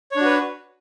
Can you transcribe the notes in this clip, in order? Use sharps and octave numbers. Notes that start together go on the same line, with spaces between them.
D4 F#4 B4 C#5